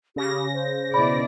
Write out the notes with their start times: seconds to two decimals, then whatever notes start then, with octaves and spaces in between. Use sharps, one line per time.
0.16 C#3 G4 A#6
0.54 C5
0.94 B2 E4 D5 B5